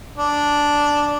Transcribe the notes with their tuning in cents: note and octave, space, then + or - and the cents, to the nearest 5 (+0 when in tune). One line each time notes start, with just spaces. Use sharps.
D4 -5